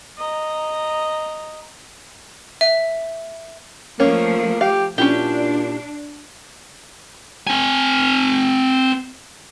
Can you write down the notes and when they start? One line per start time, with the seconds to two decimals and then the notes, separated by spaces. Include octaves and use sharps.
0.18 D#5 A#5
2.61 E5
4.00 F3 A3 A#3 C#4
4.61 G4 F5
4.98 A#2 C#4 D4 E4 G4
7.47 C4 G#5